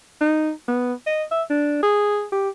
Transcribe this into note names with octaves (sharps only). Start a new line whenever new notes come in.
D#4
B3
D#5
E5
D4
G#4
G4